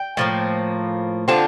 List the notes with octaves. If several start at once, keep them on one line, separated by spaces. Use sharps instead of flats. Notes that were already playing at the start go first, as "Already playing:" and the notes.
Already playing: G5
A2 F3 A#3
D3 F3 C4 F4 A5